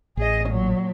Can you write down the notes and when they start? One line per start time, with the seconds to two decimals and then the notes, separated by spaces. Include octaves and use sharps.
0.17 A1 G#4 D#5
0.49 A#2 F#3